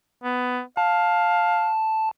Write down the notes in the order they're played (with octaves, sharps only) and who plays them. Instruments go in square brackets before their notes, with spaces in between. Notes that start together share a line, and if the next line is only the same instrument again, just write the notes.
[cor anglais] B3
[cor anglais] F5 [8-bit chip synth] A5